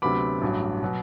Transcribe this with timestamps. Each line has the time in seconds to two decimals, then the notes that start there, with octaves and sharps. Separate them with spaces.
0.02 D2 C3 F#3 B3 B5 D6
0.41 A1 G2 F#3
0.82 B2 F#3